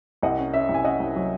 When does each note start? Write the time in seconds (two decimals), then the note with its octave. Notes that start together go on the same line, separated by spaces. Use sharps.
0.23 C2 D#5 F#5
0.38 C#4
0.54 C#4 E5
0.69 C2
0.74 G#5
0.85 C#4 D#5 F#5
1.00 C2
1.16 F#3